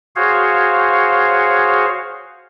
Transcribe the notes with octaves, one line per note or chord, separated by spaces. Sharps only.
F#4 G#4 C5 C#5 F5